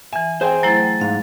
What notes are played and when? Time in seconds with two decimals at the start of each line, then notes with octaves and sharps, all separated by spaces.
0.13 E3 E5 G#5
0.41 G#4 C5 G5 G#5
0.63 F#3 A3 E4 A#5 A6
1.01 G#2 F5